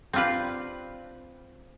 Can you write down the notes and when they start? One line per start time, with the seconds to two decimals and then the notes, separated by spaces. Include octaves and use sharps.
0.13 C4 D4 F4 G4 B4